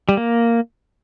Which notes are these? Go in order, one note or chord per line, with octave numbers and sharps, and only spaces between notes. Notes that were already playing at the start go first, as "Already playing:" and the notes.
G3
A#3